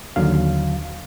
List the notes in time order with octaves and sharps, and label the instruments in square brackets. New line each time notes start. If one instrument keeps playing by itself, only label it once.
[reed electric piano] D#2 D3 F#3 F5